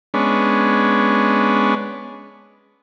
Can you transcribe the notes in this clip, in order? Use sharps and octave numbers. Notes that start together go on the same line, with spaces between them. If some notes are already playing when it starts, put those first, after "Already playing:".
G#3 B3 C#4 D4